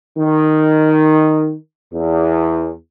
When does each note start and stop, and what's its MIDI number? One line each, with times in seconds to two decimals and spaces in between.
0.18 1.54 51
1.92 2.70 40